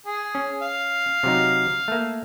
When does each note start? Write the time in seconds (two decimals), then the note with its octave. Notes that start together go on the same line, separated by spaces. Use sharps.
0.06 G#4
0.35 C#4
0.62 F5
1.23 C3 F#3 D#4
1.88 A3 A#3